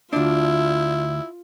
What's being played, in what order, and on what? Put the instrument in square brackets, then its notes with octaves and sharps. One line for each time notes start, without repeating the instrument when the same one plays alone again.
[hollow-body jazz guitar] D2 D4 [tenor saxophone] E4 [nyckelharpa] F4